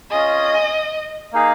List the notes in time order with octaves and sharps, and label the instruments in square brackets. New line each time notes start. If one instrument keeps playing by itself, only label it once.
[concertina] C#4 F4 G#4 [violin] D#5
[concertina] A#3 D#4 G#4 F5